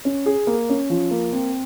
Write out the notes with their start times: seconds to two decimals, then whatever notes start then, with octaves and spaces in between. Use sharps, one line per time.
0.05 C#4
0.26 G#4
0.47 A#3
0.70 C#4
0.90 F3
1.11 A#3
1.33 C4